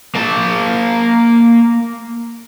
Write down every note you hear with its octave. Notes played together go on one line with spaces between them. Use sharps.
A#3 A5